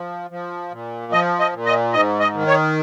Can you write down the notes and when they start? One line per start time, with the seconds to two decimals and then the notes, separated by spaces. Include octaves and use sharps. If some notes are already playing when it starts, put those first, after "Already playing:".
Already playing: F3
0.31 F3
0.71 A#2
1.12 F3 D#5
1.39 D#5
1.53 A#2
1.66 D#5
1.93 G#2 D#5
2.20 D#5
2.34 D#3
2.47 C#5